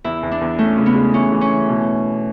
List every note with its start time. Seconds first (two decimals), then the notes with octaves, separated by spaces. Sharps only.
0.04 E2 E4
0.23 E2
0.31 D4
0.41 E2
0.59 A3 C#4
0.78 C#3
0.86 B3
0.95 G#3
1.14 E3 C#4
1.32 E3
1.41 C#4
1.51 E3
1.69 B2